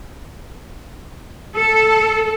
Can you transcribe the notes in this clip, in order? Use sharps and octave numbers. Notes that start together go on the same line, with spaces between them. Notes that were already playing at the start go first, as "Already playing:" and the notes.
A4